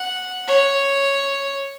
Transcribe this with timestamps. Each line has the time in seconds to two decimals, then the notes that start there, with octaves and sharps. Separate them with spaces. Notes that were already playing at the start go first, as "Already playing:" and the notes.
Already playing: F#5
0.48 C#5